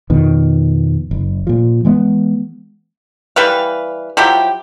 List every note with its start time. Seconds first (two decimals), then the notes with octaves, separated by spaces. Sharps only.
0.10 F2 B2 D#3
1.11 F#1
1.47 A#2 F3
1.85 E3 G#3 B3
3.36 E3 G3 B4 F5
4.17 F3 F#3 E4 G4